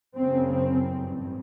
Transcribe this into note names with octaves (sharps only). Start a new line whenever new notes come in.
F#1 F#2 C#3 C4
C4
A1 G2